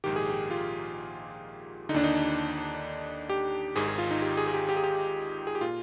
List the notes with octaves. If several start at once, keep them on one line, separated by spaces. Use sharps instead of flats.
A#1 G#2 D#3 G4
G#4
G4
F4
D3 D#4
D#2 D4
D#4
G4
G#1 G#2 D#3 G#4
G#4
F4
D#4
G4
G#4
G#4
G4
G4
G#4
G4
G#4
G4
A#2 F4